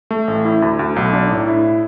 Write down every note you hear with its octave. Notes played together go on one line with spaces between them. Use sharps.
A3
A1
E4
D2
D2
B1
D4
A2
E4